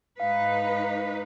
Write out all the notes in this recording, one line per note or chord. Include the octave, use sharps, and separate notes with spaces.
G#2 D#4 B4 F5